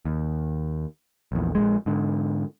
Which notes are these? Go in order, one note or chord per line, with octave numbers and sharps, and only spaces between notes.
D#2
A#1 E2
A#1 D#2 G#3
G#2 D3